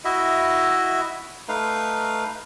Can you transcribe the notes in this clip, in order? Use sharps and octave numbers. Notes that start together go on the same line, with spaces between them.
E4 F#4 D#5 E5
A3 D#4 B4 F5